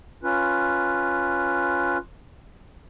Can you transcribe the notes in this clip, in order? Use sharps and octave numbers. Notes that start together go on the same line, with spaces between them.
C#4 F4 B4